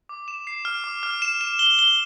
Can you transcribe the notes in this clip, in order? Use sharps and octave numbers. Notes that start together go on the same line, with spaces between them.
D6
E7
C7
F6
D6
F6
E7
E7
G7
G7